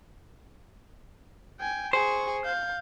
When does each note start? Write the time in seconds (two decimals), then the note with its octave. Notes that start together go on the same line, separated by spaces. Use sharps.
1.60 G5 G#5
1.93 G#4 C5 C#6
2.45 F5 G6